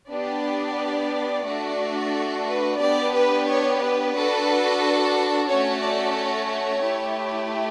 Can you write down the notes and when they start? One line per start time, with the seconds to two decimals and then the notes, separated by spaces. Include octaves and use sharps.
0.10 B3 D4 G4 D5
1.46 A3 D4 F#4 A4
2.47 B4
2.80 B3 D4 G4 D5
3.14 B4
3.47 C#5
3.81 B4
4.15 D4 F#4 A4
5.49 A3 C#4 F#4 A4 C#5
5.82 D5
6.16 C#5
6.84 A3 E4 G4